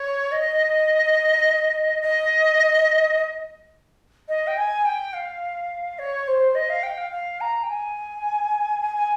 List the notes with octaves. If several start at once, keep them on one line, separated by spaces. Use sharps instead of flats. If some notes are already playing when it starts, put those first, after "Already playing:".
Already playing: C#5
D#5
D#5
D#5
G5
G#5
G5
F5
C#5
C5
D#5
F5
G5
F5
F5
A#5
G5
G#5
G#5
G#5